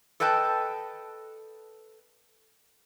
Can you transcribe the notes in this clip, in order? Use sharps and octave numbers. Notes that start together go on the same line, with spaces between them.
A4 B4 D#5 G5 A5